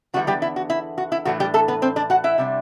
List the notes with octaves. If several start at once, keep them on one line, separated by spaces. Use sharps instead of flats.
E2 D3 G3 B3 E4 F#4
G3 G4
E4
F#4
E4
F#4
E4
A2 E3 A3 D4 F#4
G3 G4
A3 A4
B3 B4
C4 C5
D4 D5
F#4 F#5
E4 E5
C3 G3 D4